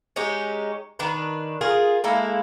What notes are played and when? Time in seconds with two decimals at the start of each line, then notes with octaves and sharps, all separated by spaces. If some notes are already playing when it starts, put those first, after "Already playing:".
0.16 G#3 C#4 D#4 G4
0.99 D#3 D4 B4
1.61 F4 G#4 A#4
2.04 G#3 A#3 E4 A4